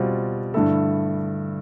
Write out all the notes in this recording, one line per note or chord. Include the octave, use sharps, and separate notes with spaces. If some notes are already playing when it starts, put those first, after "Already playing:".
Already playing: B2 G3 C4 F4
G2 D3 A3 E4 A4